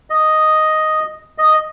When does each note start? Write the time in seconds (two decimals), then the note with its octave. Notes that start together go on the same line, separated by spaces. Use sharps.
0.10 D#5
1.38 D#5